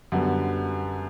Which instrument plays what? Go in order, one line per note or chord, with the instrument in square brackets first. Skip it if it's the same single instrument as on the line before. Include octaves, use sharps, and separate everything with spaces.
[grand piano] F#2 D3 G3 B3 F#4